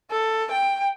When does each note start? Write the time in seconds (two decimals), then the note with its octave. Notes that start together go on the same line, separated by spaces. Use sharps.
0.11 A4
0.52 G5